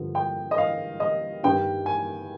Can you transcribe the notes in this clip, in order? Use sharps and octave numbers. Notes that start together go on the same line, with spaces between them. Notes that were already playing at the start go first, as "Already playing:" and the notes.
Already playing: G2 D3 F3
G5
D#5
F5
D#5
G2 D#3 G3 G5
G#5